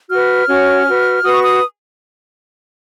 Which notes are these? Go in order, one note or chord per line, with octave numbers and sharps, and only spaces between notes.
F#4 B4 F6
C#4 F#4 C#5
F#4 B4
F#4 B4 D#6
C#6
D#6